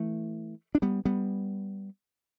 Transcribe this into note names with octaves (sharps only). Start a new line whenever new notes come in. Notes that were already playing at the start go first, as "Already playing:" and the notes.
Already playing: E3 A3
D4
G3 B3
G3 B3